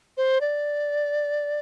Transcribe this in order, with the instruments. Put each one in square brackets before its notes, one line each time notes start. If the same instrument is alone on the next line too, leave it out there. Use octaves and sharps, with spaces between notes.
[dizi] C5
D5